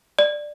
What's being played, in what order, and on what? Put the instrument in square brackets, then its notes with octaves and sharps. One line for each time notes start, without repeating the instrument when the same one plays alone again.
[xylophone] D5